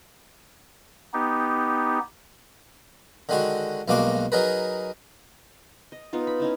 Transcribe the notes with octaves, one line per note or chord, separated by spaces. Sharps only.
B3 D#4 G4
D3 D#3 G#3 F#4
B1 G2 G#3 A#3 F#4 D6
F#3 D#4 G#4 A#4 B4
D#5
B3 D#4 F4
B5
C#4 D#4 E4